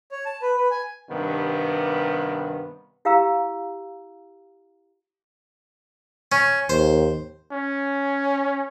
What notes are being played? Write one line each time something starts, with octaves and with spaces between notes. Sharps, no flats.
C#5
A5
B4
B4
G#5
G2 C3 D#3 B3
E4 G4 F5 G5 A#5 E6
C#4
D#2 C5
C#4